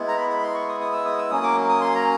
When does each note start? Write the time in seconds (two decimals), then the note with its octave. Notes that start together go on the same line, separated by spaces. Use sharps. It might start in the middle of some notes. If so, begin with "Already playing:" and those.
Already playing: G#3 B3 E4
0.08 A#5
0.17 B5
0.30 B5
0.42 C6
0.55 C#6
0.68 D#6
0.81 D#6
0.93 E6
1.06 D#6
1.18 E6
1.31 F#3 A#3 C#4 D#6
1.43 D6
1.69 D#6
1.81 C6
1.94 A#5